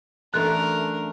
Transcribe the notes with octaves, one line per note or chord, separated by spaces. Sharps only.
F#2 E3 A3 D4 A4 A#4 C6 F#6